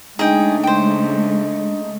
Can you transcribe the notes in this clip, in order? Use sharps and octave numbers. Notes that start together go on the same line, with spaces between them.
C#3 G#3 A3 D4 D#4 G#4 G5
C5 G5